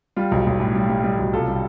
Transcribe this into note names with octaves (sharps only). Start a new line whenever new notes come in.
G3 F4
B1
B1
A2
G3
G3
G3
B1
C2 F4 A4
G3